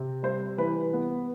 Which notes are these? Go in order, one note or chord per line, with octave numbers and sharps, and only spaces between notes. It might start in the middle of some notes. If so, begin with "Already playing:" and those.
Already playing: C3 C4
G3 C5
E3 B4
B3